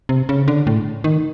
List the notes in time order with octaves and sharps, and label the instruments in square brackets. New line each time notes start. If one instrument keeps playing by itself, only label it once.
[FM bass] C3
C#3
D3
A2
D#3